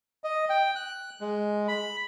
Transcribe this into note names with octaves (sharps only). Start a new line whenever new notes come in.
D#5
G5
F#6
G#3
B5